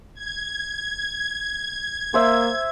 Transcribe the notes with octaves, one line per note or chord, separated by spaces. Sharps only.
G#6
A#3 C5 E5